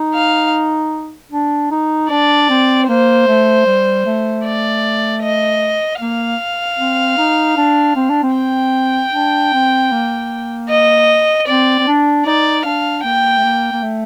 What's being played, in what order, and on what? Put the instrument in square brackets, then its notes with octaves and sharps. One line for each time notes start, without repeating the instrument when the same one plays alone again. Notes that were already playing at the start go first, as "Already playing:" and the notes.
Already playing: [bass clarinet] D#4
[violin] F5
[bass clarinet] D4
D#4
[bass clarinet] D4 [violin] D5
[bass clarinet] C4
[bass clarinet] A#3 [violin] C5
[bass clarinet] A3
G3
A3
[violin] D5
D#5
[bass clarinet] A#3 [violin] F5
[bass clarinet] C4
D#4
D4
C4
D4
C4
[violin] G5
[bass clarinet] D4
C4
A#3
[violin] D#5
[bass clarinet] C4 [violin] D5
[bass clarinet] C4
D4
[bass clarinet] D#4 [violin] D5
[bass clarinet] D4 [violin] F5
[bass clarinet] A#3 [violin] G5
[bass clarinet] A3
A#3
A#3
A3